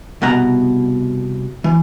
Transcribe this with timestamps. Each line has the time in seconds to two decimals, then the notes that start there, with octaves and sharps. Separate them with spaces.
0.22 C2 B2 F#5 A#5
1.64 E3